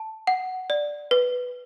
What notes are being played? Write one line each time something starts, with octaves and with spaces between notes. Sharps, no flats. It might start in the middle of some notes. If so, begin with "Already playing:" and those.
Already playing: A5
F#5
D5
B4